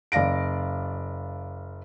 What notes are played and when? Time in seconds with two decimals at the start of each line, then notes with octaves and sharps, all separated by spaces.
0.12 F#1 D5 F5 A#6 D7